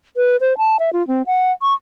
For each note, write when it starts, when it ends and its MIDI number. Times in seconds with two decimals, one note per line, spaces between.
0.17 0.36 71
0.41 0.57 72
0.58 0.77 81
0.79 0.90 76
0.93 1.06 65
1.08 1.22 60
1.26 1.52 78
1.62 1.74 85